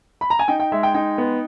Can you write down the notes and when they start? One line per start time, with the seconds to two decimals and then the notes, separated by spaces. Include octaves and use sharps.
0.21 B5
0.30 A#5
0.39 G#5
0.48 D#4 G5
0.60 G5
0.72 G#3 E5
0.83 G5
0.94 D#4 G5
1.18 B3